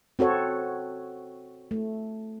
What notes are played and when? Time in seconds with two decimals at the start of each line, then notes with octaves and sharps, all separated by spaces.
0.19 C4 F#4 A4 C#5
1.71 A3